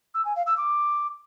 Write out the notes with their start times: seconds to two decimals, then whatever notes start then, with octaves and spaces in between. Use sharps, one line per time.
0.14 E6
0.25 G#5
0.36 F5
0.47 E6
0.57 D6